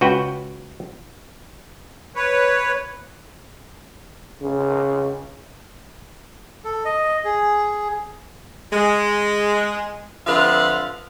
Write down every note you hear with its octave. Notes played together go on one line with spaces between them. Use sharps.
C#2 F#4 B4 G5
B4 C#5
C#3
A4
D#5
G#4
G#3
D3 F3 C4 B4 E5 F5